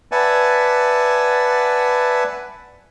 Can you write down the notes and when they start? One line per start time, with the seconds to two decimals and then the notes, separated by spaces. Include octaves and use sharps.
0.12 B4 D5 E5 F#5 G#5 A5